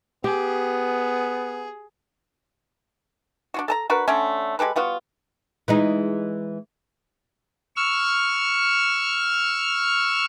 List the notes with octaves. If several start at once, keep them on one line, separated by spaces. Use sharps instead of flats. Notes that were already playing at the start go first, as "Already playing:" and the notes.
B3 G4 G#4
D4 F4 F#4
A4 A5 A#5
D4 F#4 A#4 B4
D3 A3 C#4
G#3 G4 A4 B4
G3 B3 F4 F#4
E3 G#3 D#4
C#6 E6 F6